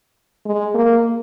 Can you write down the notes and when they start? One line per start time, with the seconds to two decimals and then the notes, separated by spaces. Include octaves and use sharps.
0.45 G#3
0.75 A#3